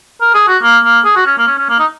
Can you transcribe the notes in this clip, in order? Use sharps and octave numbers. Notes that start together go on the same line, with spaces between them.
A#4
G#4
F#4
A#3
A#3
G#4
F#4
C#4
A#3
C#4
C#4
A#3
D#4